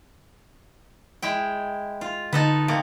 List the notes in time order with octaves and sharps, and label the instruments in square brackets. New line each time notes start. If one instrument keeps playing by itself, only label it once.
[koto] G#3 E4 G5
F4
[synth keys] D3 [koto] D#4 A4 B4
[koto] C3 A#3